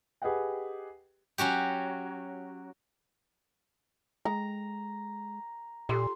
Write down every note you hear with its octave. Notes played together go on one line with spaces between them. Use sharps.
G4 G#4 B4 D#5 F#5 G5
F#3 C#4 F#4 G4
G#3 A#5
A#2 F4 G4 A4 C6